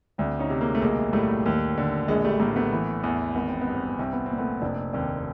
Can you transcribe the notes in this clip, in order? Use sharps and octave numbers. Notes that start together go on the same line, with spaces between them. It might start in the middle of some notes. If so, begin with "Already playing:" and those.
D2 C4 D4
C#4 D#4
C3
G#3 A#3
A3
B1 G#3 A#3
A2 G3 A3
D#2
D3
A#1 G#3
G3 A3
A2 G#3 A#3
A3 B3
E3
E2
G#1 B3
C4
B3
G2
C4
B3
C2 C4
B3
A#2 C4
A3 B3
F1 C4 D4
D#2 C4 D4